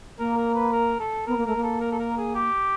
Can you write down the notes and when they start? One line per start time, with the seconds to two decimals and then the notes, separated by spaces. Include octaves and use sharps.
0.19 A#3 A#4
0.37 A#4
0.54 B4
0.72 A#4
1.00 A4
1.26 B3 A#4
1.37 A#3
1.45 A3 A#4
1.56 A#3
1.63 A4
1.81 A#4
1.91 A4
1.99 A#4
2.17 G#4
2.34 G4